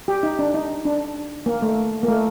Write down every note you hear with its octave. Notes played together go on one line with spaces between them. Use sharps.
G4
D#4
D4
D#4
D4
A#3
A3
A#3
A3